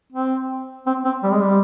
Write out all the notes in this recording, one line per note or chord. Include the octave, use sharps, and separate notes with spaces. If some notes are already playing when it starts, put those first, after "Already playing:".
C4
C4
C4
G3
G#3
G3